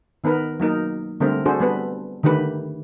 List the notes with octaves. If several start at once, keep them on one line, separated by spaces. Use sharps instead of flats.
D#3 B3 D#4 A#4 B4
F#3 A#3 D#4 A#4
D3 G3 A3 C4 A#4
D4 F#4 G#4 A4 C5
G3 B3 B4
D3 D#3 A3 G4 B4